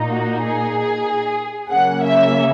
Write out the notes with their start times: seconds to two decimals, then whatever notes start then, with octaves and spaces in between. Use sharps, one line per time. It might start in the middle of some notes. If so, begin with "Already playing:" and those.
Already playing: A#2 A#3 D#4
0.10 F#4
0.43 G#4
1.70 C#3 F#3 A#3 C#4 F#5
2.04 E5